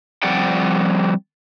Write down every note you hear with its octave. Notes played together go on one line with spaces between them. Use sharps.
F3 G3 C4 D5 F#5 G5